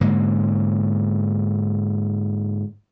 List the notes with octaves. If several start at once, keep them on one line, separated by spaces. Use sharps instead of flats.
G#2 D3 A#3